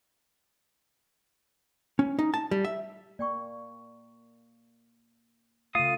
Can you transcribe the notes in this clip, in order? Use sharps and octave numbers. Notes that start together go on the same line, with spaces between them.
C#4
D#4
A5
G3
E5
A#3 D5 G5 C#6
C#3 A3 F4 F5 D#6 D#7